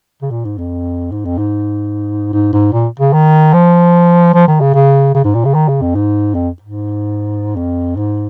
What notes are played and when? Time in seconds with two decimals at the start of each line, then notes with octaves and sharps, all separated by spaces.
0.22 C#3
0.31 A#2
0.45 G#2
0.58 F2
1.12 G#2
1.25 F2
1.38 G#2
2.33 G#2
2.53 G#2
2.73 A#2
2.99 C#3
3.13 D#3
3.53 F3
4.34 F3
4.48 D#3
4.60 C#3
4.74 C#3
5.14 C#3
5.24 G#2
5.35 A#2
5.45 C#3
5.54 D#3
5.68 C#3
5.81 F2
5.95 G#2
6.35 F2
6.62 G#2
7.56 F2
7.96 G#2